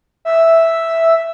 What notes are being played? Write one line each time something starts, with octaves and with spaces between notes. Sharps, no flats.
E5